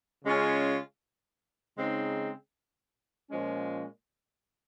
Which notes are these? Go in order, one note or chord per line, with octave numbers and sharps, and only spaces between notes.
C#3 G#3 C#4 F4
C#3 G#3 C4 D#4
A#2 F3 G#3 C#4